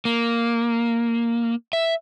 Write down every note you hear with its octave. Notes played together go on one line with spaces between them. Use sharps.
A#3
E5